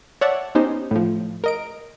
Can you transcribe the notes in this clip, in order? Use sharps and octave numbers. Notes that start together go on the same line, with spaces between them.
C#5 D5 E5 F#5 A5
B3 C#4 D#4 G4 C5
A2 F3
A#4 D#5 D7